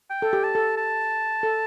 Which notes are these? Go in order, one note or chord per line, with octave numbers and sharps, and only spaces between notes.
G5
A4
G4
A5
A4
A5
A4